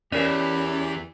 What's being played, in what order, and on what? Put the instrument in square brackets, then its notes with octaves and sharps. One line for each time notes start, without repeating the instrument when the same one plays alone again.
[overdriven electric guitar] E2 [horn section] E3 G4 [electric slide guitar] C#4 [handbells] E4 A#4 D5